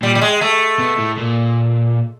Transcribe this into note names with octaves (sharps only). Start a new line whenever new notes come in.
A#2 G3
G3
G#3
A3
B2
A2
A#2